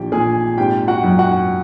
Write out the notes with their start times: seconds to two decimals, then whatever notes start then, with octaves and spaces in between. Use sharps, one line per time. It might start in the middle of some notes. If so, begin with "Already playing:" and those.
Already playing: A#1 E3 G4
0.12 A#2 G#4 G#5
0.58 G#1 G4 G5
0.88 F#4 F#5
1.03 F#2
1.19 F#4 F#5